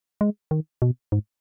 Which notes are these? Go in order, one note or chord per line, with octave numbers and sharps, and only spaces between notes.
G#3
D#3
B2
G#2